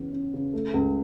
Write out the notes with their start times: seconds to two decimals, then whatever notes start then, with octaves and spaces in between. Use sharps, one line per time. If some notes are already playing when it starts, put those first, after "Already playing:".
Already playing: E2 C#3 C#4
0.13 C#4
0.34 C#3
0.54 A3
0.74 C#2